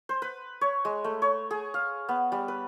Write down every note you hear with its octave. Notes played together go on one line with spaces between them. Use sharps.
C5
B4
C#5
G#3
A3
C#5
G#4
F5
B3
G3
B4